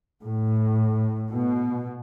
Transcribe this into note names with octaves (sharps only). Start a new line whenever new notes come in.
A2
B2